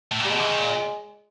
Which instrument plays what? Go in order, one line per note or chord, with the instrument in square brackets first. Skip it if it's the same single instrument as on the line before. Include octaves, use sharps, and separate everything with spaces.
[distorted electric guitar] A2
A#2
[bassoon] G3
[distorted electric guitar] B2 [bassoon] G#3
[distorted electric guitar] E3
D#3
A#2